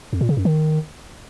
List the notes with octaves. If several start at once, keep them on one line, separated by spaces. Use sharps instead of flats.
F2
A#2
C#3
F#2
D#3